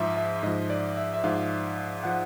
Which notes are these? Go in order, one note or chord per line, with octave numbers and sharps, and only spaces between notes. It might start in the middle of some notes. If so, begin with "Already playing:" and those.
Already playing: G#2 F3 E5
E5
G#2 F3 D#5
D5
E5
E5
G#2 F3 F5
F3 F#5